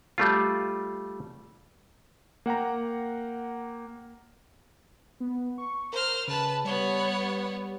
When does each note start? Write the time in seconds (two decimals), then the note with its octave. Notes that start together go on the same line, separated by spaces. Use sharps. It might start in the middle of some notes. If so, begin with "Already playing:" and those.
0.18 G3 A3 F4
2.46 A#3 F#5 G5 A#5
5.20 B3
5.58 C#6
5.93 A#4 C5 F6
6.28 C#3 B4 A5
6.65 G3 B3 C#5